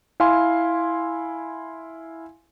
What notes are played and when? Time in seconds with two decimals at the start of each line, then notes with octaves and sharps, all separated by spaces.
0.20 E4 F5 G#5 C6